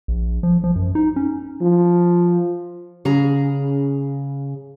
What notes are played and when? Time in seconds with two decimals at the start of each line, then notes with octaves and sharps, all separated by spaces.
0.08 A#1
0.43 F3
0.64 F3
0.76 F#2
0.95 D#4
1.16 C#4
1.61 F3
3.05 C#3 G#4 A#5